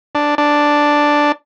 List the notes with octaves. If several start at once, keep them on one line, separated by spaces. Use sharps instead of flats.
D4
D4